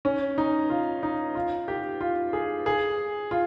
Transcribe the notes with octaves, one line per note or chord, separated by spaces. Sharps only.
C#4
D#4
F4
D#4
F4
G4
F4
G#4
G#4
F4